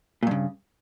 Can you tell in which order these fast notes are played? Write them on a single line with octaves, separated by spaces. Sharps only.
A#2 G2 C#3